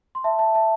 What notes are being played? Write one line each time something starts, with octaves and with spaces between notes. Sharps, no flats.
C6
E5 A5
E5 A5
E5 A5